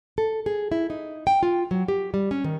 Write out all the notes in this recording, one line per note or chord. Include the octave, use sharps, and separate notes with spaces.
A4
G#4
E4
D#4
G5
F4
F#3
G4
G3
C#4
D#3